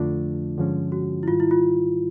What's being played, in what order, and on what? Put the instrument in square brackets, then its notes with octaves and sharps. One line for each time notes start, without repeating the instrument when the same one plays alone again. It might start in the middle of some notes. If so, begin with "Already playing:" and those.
Already playing: [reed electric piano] F2 D3 F3 A3 D4 [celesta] F4
[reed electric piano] G2 D3 F3 G#3 C#4
[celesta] F#4
E4
[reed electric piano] G#2 D#3 G3 [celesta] F4
[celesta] E4
F4